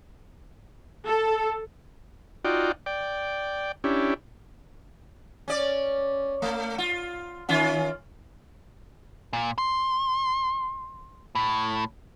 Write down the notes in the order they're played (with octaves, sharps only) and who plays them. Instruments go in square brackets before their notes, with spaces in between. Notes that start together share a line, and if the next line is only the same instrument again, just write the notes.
[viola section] A4
[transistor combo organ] D#4 F4 F#4 D5 G5
D5 G5
C#4 D4 E4 G4
[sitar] C#4 D5
A3
F4
D#3 C#4 F4
[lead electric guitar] A#2
C6
A2